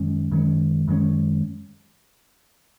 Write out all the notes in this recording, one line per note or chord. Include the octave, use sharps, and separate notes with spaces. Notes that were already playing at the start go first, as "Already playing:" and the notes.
Already playing: F#2 D#3 G#3 C#4
F#2 D#3 G#3 C#4
F#2 D#3 G#3 C#4